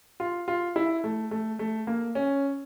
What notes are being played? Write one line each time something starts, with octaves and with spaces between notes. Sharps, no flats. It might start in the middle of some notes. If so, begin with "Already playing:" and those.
F4
F4
E4
A3
A3
A3
A#3
C#4